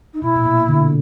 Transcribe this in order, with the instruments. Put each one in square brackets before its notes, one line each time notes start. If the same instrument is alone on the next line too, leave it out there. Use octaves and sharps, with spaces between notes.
[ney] D#4
[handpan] B2 [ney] E4
[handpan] A#2
B2
D3